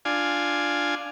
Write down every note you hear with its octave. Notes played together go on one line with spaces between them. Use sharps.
D4 F4 G#5